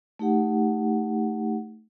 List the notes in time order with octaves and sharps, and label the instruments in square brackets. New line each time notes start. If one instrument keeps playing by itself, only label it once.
[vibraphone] A3 D#4 G4 F#5